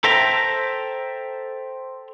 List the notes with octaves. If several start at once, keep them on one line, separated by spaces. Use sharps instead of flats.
A4 C5 E5 G5 A#5